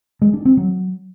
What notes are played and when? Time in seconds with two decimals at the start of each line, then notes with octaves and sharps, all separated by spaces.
0.22 G#3
0.33 D4
0.45 C4
0.57 F#3